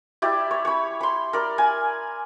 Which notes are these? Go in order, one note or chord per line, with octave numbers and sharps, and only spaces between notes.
E4 G4 D5
C#5
C#5 B5
B5 C6
A#4 D5
G#5